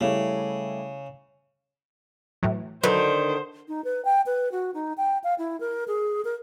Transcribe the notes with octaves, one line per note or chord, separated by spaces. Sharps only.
C#3 G3 A3 E4
A2 E3 F#3
D3 D#3 F#3 B4 C5
D#4
B4
G5
B4
F#4
D#4
G5
F5
E4
A#4
G#4
A#4